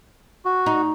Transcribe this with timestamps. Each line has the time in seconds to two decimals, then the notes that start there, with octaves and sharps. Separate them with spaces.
0.45 F#4
0.66 D#4